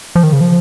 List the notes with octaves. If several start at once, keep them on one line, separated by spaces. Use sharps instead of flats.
F3
D#3
C#3
F3